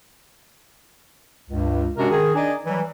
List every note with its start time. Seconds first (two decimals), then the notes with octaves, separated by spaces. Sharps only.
1.50 C#2 G2
1.97 C3 G#3 C#4 D4 F#4 A#4
2.10 D#3 G#4
2.34 D4 D#4 D5 D#5 G#5
2.66 E3 F#3 G3